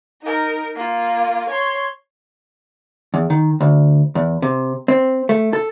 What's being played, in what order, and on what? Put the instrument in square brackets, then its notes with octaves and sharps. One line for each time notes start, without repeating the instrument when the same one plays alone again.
[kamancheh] D#4 A#4
A#3 F4
C#5 C6
[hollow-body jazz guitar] E2
D#3
D2
E2
C3
C4
A3
A4